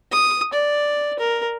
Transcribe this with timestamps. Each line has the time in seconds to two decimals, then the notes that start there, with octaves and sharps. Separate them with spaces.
0.12 D#6
0.53 D5
1.19 A#4